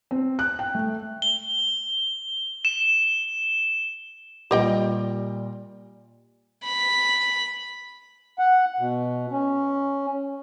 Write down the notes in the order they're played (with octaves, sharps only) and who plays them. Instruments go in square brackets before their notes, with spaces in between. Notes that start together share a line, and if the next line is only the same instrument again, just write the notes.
[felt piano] C4
F#6
G5
A3
[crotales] G7
E7
[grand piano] A#2 G3 [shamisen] G4 D#5 G5
[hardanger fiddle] B5
[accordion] F#5
B2
C#4